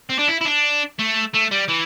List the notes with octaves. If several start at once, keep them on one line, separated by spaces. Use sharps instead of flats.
C4
D4
E4
E4
D4
A3
A3
G3
E3